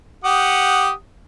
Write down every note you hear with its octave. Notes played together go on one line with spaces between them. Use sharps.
G4 F#5 D#6